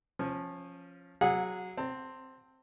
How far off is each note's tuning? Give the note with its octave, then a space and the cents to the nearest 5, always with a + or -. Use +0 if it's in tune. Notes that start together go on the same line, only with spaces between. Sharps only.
F3 +0 C#4 -20
F#3 +0 G#4 -15 F#5 -25
C4 +0 A5 +35